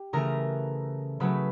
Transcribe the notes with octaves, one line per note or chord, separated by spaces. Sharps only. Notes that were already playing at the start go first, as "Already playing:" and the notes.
Already playing: G4 G5
C#3 E3 A3 A#4 A#5
C#3 F#3 A3 B4 B5